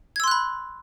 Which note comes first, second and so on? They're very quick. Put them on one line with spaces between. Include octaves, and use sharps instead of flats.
G#6 E6 C6 F#6 B5